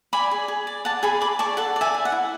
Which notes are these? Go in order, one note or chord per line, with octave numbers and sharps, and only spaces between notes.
D5 G#5 B5
G#4
G#4
D5
D5 F#5 A5
G#4 G#5 B5
G#4 B5 D6
D5 A5 C#6
A4 F#5 A5
D5
E5 G#5
E4
F#5
E4